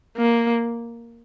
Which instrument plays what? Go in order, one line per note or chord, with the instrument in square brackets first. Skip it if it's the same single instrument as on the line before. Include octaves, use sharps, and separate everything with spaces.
[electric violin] A#3